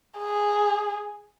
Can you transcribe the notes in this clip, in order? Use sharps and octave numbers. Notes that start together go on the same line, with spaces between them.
G#4